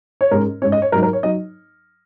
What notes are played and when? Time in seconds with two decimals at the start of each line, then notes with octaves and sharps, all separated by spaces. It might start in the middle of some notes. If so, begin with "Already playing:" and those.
0.21 C#5
0.31 G#2 G#3 C#4 A#4
0.62 G#2 G#3 C#4 C#5
0.72 D#5
0.82 C#5
0.92 G#2 F#3 D#4 A#4
1.03 A#4
1.13 C#5
1.23 F#3 D#4 D#5